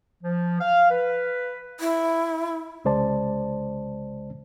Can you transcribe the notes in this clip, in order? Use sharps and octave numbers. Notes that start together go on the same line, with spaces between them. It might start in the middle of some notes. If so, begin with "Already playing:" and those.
F3
F5
B4
E4
C2 C#3 G#3 C5 D5 A5